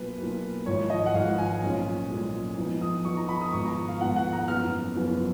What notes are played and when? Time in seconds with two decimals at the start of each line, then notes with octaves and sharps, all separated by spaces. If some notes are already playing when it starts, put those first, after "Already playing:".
Already playing: B1 B2 A#3 F4 B4
0.18 B1 B2 A#3 F4
0.66 G#1 G#2 F3 G#3 C#5
0.90 D#5
1.06 F#5
1.13 G#1 G#2 F3 G#3 F5
1.38 G#5
1.62 B1 A#2 G#3 C#4 F4
2.10 B1 A#2 G#3 C#4 F4
2.58 F2 F3 B3 D#4
2.81 D#6
3.05 F2 F3 B3 D#4 C#6
3.17 A#5
3.29 B5
3.41 D#6
3.53 G#1 G#2 F3 B3 F4 C#6
3.65 A#5
3.88 F5
4.01 G#1 G#2 F3 B3 F4 F#5
4.16 F#5
4.33 A#5
4.48 F#1 F#2 F3 B3 F6
4.96 F#1 F#2 F3 B3